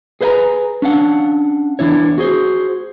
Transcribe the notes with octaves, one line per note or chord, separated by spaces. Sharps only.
G#4 B4 C5 E5 G#5 A#5
C#4 D4 F5 F#5
E2 G#2 E3 D4 E4 C#5
F#4 G#4 C5